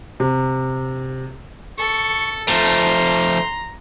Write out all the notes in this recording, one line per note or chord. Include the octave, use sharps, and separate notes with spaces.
C3
A4 C#6
F3 A3 A#5 C6